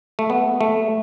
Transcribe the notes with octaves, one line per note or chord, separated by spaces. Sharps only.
A3
B3
A3